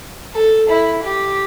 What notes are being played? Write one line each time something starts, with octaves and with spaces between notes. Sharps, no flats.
A4
E4
G4